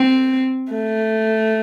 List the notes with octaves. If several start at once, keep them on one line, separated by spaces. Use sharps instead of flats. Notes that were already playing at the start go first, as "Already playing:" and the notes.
Already playing: C4
A3